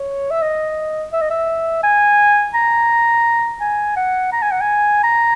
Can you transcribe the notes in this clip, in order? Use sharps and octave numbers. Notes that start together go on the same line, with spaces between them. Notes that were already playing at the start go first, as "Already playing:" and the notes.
Already playing: C#5
E5
D#5
E5
D#5
E5
G#5
A#5
G#5
F#5
A#5
G#5
F#5
G#5
A#5